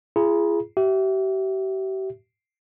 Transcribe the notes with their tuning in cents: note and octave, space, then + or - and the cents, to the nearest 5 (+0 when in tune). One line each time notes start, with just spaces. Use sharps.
F4 -45 G#4 +0 A#5 +40
G4 -40 E5 +0